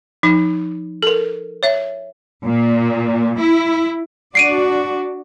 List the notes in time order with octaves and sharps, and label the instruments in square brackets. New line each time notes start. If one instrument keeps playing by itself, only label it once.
[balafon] F3 D#4
A4 A#4
C#5 E5
[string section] A#2
E4
[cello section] D4 F#4 D5 [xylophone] C7 D7 D#7